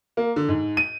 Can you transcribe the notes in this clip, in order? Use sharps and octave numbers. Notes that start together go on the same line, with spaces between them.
A#3
D3
G#2
D#7